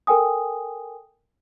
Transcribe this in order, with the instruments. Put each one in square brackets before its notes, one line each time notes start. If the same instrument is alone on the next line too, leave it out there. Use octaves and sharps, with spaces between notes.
[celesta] A4 A#4 G5 G#5 D#6